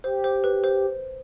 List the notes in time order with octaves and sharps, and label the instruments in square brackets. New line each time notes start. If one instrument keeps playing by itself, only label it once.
[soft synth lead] G4 [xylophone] C5
[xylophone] C5
B4
C5